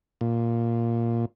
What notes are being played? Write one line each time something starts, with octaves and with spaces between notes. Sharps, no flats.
A#2